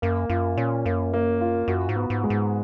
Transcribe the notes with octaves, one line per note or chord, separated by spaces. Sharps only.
F#2 A#3
F#2 F4
A#2 C#4
F#2 A#3
A#3
F4
F#2 F#4
G#2
B3
G#2
G#3
G#2